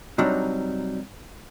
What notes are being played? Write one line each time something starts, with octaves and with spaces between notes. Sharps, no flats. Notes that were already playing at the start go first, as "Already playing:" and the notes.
C3 F#3 G3 D4 D#4